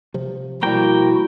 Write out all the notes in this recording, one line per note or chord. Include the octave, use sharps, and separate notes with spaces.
C3 F3
B2 F3 G3 A#3 E4 F#4 A#4 G5